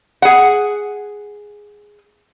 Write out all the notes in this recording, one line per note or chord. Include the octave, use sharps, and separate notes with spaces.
G#4 F#5